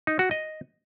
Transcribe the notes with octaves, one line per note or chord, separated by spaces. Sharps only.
D#4
F#4
D#5